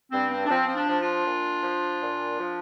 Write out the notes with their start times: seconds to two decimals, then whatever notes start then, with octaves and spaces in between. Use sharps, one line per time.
0.12 G2 C4
0.31 C4
0.46 D4
0.50 F3 C4
0.67 C4
0.75 D4
0.88 F3
1.00 D4 F4
1.26 A#2
1.63 F3
2.01 A#2
2.39 F3